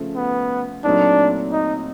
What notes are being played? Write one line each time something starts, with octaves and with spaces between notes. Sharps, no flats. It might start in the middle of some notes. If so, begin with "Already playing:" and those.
Already playing: C#3 F3 A3
B3
A#2 F#3 A3 C4 D4 D#4
D#4